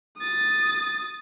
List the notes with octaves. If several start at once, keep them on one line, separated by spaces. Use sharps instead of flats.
D#6 A6